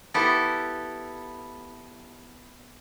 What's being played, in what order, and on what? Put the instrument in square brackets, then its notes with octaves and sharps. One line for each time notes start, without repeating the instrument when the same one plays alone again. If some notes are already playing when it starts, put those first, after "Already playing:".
[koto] B3 E4 G4 A4